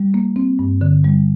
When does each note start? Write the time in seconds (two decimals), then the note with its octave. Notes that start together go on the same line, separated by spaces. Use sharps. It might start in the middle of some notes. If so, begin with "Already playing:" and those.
Already playing: G3
0.14 A#3
0.36 C4
0.59 G2
0.81 D3
1.04 G3